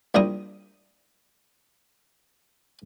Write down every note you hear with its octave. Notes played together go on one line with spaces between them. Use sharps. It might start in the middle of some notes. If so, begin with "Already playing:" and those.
A#1 G3 E4 G5 A#5 D#6